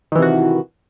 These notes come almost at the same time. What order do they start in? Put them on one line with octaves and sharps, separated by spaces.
D#3 E3 C3 F#4